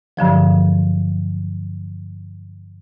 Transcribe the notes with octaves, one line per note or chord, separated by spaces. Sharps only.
G2 D3 F3 F#3